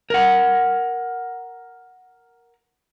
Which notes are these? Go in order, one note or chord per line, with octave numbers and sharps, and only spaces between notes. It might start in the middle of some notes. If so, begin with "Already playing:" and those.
A#4 F#5